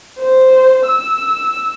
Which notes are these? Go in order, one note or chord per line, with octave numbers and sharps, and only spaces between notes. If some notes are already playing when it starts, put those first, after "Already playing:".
C5
E6